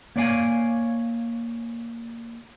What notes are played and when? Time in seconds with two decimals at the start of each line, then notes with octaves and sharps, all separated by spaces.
0.16 A#3 C#5 D5 F5 G#5